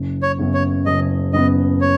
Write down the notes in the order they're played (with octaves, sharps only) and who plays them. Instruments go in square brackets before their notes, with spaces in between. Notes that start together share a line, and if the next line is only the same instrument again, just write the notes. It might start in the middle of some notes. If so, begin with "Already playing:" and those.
Already playing: [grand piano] F#1
[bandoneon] C#5
[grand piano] F#2 C#3 B3
[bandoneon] C#5
[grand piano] F#1 [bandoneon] D#5
[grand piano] F#2 C#3 B3 [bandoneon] D#5
[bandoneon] C#5